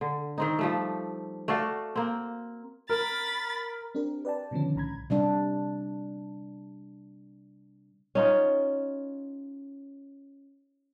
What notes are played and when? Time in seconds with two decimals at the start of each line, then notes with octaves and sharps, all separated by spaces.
0.01 D3
0.38 D#3 C4 D#4
0.59 F3 G3 A3
1.48 A3 F#4 D5 F5
1.96 A#3 C4
2.90 A#4 B5 A6
3.95 C4 D4 G4 A#4
4.25 B4 D5 G5 A5
4.51 B2 D3 D#3 F3 C#4
4.75 C2 A2 A#5 B5 G#6
5.10 C3 G3 D4
8.15 C#4 D#4 F4